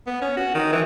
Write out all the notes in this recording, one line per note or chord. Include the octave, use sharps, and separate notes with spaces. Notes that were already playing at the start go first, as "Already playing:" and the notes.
B3
C#4
F#4
D#3
E3